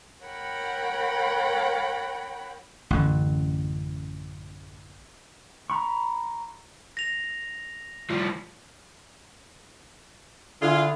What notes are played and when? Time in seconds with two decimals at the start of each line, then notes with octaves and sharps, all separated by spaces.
0.25 A#4 C#5 F#5 G5 B5
2.90 A1 F#2 D3
5.70 A#5 B5 C#6
6.97 A#6 F7
8.11 F3 G3
10.62 D3 E4 F4 G#4